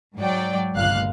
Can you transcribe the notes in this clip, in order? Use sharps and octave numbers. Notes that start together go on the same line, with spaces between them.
G#2 F#3 D5 G5
G1 C#2 A#2 F5 F#6